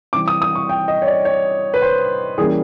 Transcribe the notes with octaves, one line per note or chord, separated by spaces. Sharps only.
E3 G3 C4 D6
D#6
D#6
C#6
G5
D#5
C#5
D5
C#5
B4
C5
E3 G3 A#3 C#4 G#4